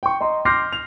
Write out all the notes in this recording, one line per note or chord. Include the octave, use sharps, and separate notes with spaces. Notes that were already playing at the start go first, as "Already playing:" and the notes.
G5 C#6
D#5 A#5 C6
C6 D6 F6 G6 A#6 C7
F7